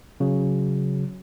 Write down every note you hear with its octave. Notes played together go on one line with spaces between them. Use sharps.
C#3 F#3